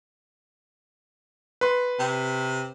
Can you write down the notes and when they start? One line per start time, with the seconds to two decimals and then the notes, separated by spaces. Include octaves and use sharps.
1.61 B4 C6
1.99 C3